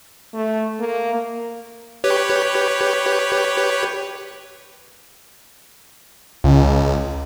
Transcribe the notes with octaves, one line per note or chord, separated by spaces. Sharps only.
A3
A#3
G4 B4 C#5
C#2